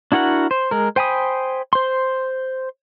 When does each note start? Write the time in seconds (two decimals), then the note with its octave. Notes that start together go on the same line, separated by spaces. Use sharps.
0.12 D4 E4 F#4 A#4 F#5
0.51 C5
0.71 G#3 A#4
0.96 C5 G5 G#5 B5 D#6
1.73 C5 C6